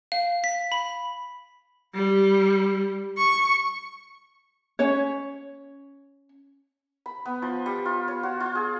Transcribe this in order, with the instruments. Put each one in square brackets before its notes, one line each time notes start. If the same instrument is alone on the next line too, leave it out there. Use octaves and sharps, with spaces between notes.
[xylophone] F5
B6
B5
[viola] G3
C#6
[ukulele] C#4 C#5
[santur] B5
B3
F3
G3
F4
C#5
F#4
F4
G#4